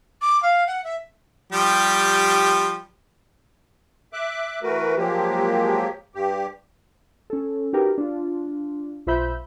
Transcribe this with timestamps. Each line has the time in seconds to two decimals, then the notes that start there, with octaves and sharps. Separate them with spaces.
0.22 D6
0.43 F5
0.67 F#5
0.84 E5
1.52 F3 G3 G4
4.13 E5 D6 F#6
4.63 E3 A3 F#4 A#4 B4
4.97 F3 F#3 G#3 A#3 G4
6.15 G2 G4
7.30 C#4 A4
7.73 D#4 F#4 G4 A#4 B4
7.98 D4 F4
9.07 B1 F4 C5 E5 B5 G6